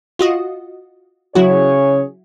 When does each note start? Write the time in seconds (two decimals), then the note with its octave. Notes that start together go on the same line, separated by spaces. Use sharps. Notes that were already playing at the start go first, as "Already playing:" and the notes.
0.19 F4 F#4 D#5
1.35 C#3 F#3 E4 F#4 G#4 C#5